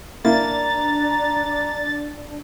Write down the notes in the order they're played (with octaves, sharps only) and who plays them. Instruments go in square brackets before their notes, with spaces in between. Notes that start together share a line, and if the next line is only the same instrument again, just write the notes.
[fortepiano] A#3 E4 [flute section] D4 [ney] A#5 [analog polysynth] A6